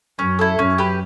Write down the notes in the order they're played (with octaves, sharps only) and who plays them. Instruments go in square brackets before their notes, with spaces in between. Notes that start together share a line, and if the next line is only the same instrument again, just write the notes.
[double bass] F#2 [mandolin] C#4
[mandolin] E4 A4
[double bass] F#2 [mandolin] C#4
[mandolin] G4 B4